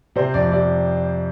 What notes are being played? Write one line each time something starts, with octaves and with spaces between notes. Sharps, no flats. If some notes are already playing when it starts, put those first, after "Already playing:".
C3 C5
F2 D5
C3 D5